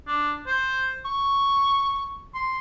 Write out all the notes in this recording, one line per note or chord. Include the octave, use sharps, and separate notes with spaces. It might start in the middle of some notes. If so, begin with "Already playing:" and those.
D4
C5
C#6
C6